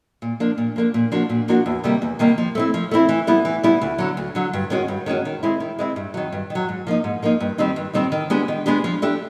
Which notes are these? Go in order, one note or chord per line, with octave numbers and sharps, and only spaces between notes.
A#2
F3 A#3 D4
A#2
F3 A#3 D4
A#2
F3 A#3 D4 F#4
A#2
F3 A#3 D4 F#4
E2
C3 D#3 G3 A#3
E2
C3 D#3 G3 A#3
F3
A3 C4 E4
F3
A3 C4 E4
E3
G3 B3 E4
E3
G3 B3 E4
D2
D3 F#3
D2
D3 F#3
G2
D#3 G#3 C#4 F#4
G2
D#3 G#3 C#4 F#4
D#3
G#3 C4 E4
D#3
G#3 C4 E4
G2
D#3 F#3
G2
D#3
F#3
G#2
F3 A#3 D#4
G#2
F3 A#3 D#4
G2
D#3 G3 C4 D#4
G2
D#3 G3 C4 D#4
D#3
G#3 B3 D4 G4
D#3
G#3 B3 D4 G4
F3
A3 D4 G4